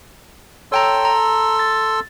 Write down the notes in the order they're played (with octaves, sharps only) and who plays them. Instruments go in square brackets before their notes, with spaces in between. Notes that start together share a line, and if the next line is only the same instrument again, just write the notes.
[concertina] A4 C6 E6 [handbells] C#5 G5 A#5
[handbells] A#5
A6